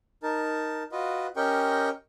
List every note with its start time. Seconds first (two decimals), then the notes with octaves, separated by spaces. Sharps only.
0.23 D#4 A#4 A5
0.92 F4 F#4 B4 D#5
1.36 C#4 G4 A#4 D#5 G5 C#6